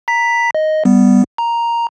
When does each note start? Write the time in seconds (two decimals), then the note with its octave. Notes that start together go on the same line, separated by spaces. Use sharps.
0.08 A#5 B6
0.55 D#5
0.85 G3 B3
1.38 A#5